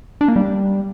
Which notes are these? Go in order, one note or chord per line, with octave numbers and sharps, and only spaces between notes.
D4
A#3
G3